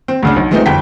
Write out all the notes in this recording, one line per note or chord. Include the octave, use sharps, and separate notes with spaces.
C4
D2 C#3 D4
B1
F3 G#3 A3 B3 C4 D#4
G1 F2 G5 B6